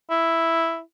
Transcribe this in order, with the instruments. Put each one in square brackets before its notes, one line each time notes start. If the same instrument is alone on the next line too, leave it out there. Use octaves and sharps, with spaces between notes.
[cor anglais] E4